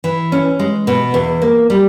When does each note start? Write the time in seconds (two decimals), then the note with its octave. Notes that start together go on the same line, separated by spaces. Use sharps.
0.04 E3
0.32 C#4
0.59 G#3
0.87 B2
1.14 E2
1.42 A#3
1.70 G3